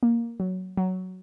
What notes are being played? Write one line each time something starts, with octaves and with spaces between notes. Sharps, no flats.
A#3
F#3
F#3